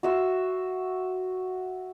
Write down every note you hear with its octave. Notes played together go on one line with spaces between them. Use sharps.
F#4 E5 C6